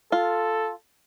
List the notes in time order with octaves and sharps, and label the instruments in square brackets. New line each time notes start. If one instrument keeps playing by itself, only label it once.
[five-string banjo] F4 [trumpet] A4